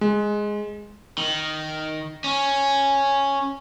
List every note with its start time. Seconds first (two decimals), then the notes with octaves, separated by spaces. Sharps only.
0.01 G#3
1.18 D#3
2.24 C#4